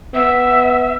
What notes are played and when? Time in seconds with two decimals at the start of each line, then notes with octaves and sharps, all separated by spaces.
0.14 B3 E5